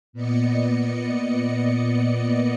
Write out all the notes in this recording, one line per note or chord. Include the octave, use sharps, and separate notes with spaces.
A#2 B3 D5 D#5 C#7